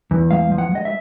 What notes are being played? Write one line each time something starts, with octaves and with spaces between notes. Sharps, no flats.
E2
G#3 F5
F3
F#5
G#3 D#5
E5